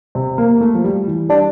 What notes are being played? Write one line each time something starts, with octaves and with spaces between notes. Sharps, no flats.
C3
A#3
A3
F3
G3
E3
G3 D4